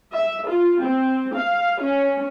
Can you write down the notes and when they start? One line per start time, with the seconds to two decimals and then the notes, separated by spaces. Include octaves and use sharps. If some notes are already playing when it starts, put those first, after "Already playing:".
0.15 E5
0.48 F4
0.83 C4
1.35 F5
1.82 C#4